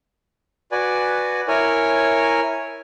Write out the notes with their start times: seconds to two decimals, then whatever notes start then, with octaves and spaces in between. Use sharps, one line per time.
0.72 F#4 B4 D5 G#5
1.48 E4 A#4 C#5 G#5